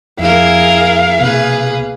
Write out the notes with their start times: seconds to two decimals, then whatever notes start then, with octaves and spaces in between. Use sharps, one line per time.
0.19 F2 E4 G#4 A#4 F5
1.21 C2 B2 A#3 G#4 B4